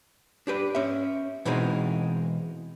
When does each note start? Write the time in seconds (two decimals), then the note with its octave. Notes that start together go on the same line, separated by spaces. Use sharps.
0.47 D4 G4 B4
0.75 C#4 E5
1.45 B2 E3 G#3 C4 D#4